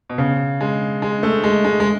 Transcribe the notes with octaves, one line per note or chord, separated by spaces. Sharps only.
B2
C#3
G#3
G#3
A3
G#3
G#3
G#3